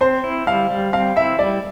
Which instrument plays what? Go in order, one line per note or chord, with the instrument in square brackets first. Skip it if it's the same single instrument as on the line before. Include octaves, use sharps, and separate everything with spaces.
[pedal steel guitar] C4 [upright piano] C5
[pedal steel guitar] E4
[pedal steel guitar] G3 [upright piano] F5
[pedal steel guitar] G3
[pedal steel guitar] C4 [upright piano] F5
[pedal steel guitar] E4 [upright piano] E5
[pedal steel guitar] G3 [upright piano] D5